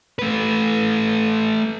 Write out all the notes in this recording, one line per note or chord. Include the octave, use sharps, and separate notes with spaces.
A3 B4